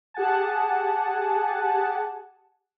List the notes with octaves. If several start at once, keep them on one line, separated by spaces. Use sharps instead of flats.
G4 G#4 F#5 G#5 A5